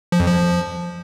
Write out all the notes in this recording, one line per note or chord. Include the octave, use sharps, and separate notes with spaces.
F3
F2
F3